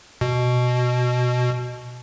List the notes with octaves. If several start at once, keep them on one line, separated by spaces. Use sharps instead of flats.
B2